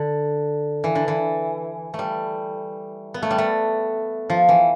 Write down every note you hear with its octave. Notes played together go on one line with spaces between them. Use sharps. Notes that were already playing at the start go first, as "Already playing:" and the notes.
Already playing: D3
E3
D3
E3
A3
G3
B3
A3
G3
A3
F3
E3